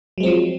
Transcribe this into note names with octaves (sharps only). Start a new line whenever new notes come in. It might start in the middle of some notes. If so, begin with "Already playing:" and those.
F3 F#3 G#3 C4